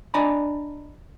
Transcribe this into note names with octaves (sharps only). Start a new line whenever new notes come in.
D4 D5 D#5 G#5 A#5 B5